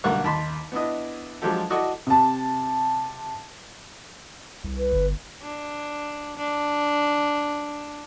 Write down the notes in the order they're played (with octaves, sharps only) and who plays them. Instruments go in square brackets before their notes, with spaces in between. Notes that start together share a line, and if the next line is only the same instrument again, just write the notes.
[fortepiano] B1 D3 G3 A#3 F#5 C#6
D#2 A5 B5 C6
B3 D4 E4 D#5
F3 F#3 G#3 D4 G4 A4
E4 F#4 A4 D5 D#5 C#6
[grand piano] C3 A5
[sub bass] C2
[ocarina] B4
[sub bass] G1
[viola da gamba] D4
D4